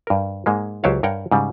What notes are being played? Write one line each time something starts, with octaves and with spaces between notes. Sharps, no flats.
G2 A#4
G#2 G#3 A#3
C#2 F#3 G4 C5 C#5 F5
G2 A#4 C#5 F#5 G5
G#2 C#3 G3